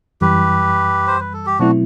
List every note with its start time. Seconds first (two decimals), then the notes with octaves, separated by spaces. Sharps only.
0.21 F#2 E3 G3 G4 B4
1.07 C5
1.20 B4
1.33 A4
1.46 G4
1.59 B2 F#3 A3 C4 D4 E4 F#4